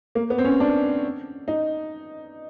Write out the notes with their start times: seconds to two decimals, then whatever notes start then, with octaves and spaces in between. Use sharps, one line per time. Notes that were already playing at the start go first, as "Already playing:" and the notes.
0.15 A#3
0.30 B3
0.38 C4
0.44 C#4
0.60 D4
1.48 D#4